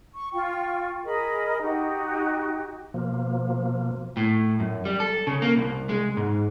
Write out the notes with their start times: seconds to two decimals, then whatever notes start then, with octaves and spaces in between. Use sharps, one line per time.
0.14 C#6
0.33 F4 G5 C#6
1.04 G#4 A#4 D#5 B5
1.62 D#4 F#4 G4
2.94 B2 F3 A#3
4.17 A2
4.60 F#2
4.85 G3
5.00 A4
5.27 C#3
5.42 A#3
5.57 C2
5.89 G#3
6.17 G#2